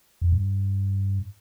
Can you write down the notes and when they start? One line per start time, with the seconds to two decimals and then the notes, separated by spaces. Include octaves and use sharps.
0.22 F2
0.32 G2